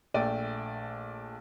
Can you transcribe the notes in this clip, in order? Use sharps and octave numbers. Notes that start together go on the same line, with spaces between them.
A#1 A3 D5 G5 D#7